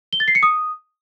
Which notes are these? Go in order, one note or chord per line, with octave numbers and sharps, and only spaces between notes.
G7
A6
C7
C#7
D#6